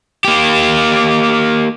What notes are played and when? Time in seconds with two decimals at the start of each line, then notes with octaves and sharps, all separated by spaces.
0.24 A#3 G4